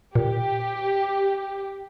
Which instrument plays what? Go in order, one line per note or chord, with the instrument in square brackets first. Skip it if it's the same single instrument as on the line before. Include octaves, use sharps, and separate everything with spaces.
[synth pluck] A#2 [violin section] G4